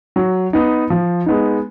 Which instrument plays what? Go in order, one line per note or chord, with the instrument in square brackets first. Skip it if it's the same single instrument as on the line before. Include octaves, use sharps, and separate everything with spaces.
[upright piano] F#3
B3 D#4
F3
G#3 B3 D#4